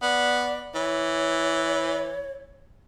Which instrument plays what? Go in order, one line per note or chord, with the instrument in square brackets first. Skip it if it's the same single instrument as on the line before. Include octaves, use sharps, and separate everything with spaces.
[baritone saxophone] B3 [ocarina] D5
[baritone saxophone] E3 [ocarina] C#5